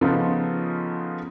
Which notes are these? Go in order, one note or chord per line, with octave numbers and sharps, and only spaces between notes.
C#3 F3 B3 D#4 F4 A4